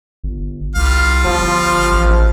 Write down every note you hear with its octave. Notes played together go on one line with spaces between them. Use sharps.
G1
C2 G3 F4 F5
G1 F3
A1